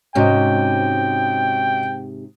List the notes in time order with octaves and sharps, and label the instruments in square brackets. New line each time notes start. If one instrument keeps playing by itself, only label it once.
[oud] G#2 C3 [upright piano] C#4 F#4 D#5 [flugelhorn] G5